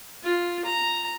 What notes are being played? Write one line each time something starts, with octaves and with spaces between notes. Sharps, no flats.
F4
A#5